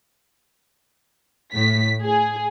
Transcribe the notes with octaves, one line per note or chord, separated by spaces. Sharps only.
A2 B6
G#4